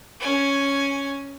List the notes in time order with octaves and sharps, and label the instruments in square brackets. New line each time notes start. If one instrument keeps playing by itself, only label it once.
[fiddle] C#4 G#5